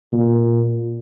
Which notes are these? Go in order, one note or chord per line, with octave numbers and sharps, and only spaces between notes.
A#2